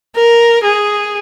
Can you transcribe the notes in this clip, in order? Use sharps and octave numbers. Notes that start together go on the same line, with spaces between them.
A#4
G#4